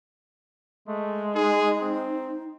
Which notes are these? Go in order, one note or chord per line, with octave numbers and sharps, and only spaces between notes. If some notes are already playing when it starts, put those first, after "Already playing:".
G#3 A3
D#4 G#4
C4